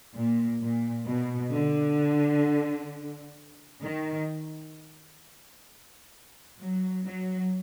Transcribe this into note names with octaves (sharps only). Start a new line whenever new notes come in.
A#2
A#2
B2
D3
D#3
F#3
F#3